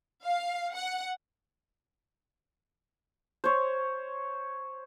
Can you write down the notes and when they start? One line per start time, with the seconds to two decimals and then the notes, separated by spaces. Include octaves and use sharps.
0.24 F5
0.76 F#5
3.44 C5 C#5